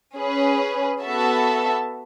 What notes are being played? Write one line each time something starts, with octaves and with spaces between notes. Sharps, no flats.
C#4 G#4 B4
B3 F#4 A4 E5 A5